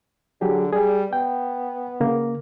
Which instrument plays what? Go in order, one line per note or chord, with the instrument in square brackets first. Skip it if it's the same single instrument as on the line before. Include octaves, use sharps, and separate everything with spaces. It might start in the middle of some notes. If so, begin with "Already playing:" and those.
[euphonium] D3 [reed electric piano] F#3 G4 G#4
[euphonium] G3 [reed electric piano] G#4
[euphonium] B3 [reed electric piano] G5
[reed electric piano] C#3 A#3